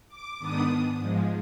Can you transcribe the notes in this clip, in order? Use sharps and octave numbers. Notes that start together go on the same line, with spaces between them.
D6
G#2 D#3 B3 D4 D#6
G#2 F3 G#3